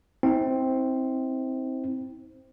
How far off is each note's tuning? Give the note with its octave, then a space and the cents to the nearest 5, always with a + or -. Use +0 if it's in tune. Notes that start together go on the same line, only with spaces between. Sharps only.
C4 +0 E4 -45